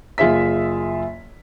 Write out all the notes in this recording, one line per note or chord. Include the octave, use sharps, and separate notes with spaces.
F#1 F4 G#4 E5 B6